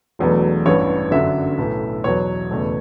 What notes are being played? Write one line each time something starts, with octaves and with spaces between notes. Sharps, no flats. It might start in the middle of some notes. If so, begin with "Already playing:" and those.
E1 E2 B2 F#3 A3
A1 G2 E3 C#5
G1 F#2 D3 F#3 E5
B1 A2 E3
E2 B2 F#3 C#5
F#1 E2 B2 A3